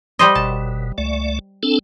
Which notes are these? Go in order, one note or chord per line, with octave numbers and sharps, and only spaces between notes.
G3 C5 D#5
F#1 B2 A5
C#2 A3 D5
C4 D4 A4